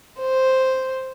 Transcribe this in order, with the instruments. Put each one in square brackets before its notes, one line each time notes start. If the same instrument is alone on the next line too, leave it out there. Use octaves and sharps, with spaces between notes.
[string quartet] C5